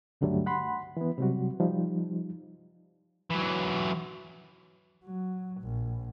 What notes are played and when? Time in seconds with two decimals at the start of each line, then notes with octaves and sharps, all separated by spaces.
0.21 C#2 G2 D3 F#3 G3 A3
0.46 F#5 B5 C6
0.97 E3 B3
1.18 C3 F#3 G3 F#4
1.60 F3 G3 D#4
3.30 E3 F#3
5.04 F#3
5.61 A#1